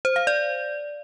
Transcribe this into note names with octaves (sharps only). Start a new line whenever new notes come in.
C5
F5
D5